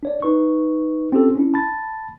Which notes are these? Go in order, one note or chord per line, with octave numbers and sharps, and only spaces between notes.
D4 C#5 D5
D#4 B4 C#6
C4 C#4 F4 G4 A4
C#4 D4 E4
A5 B5 A6